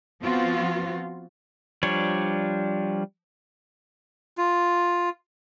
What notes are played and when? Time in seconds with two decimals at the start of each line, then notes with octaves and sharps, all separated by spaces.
0.22 F3 B3 C4 F4 F#4
1.83 F3 G3 D4 C#5
4.38 F4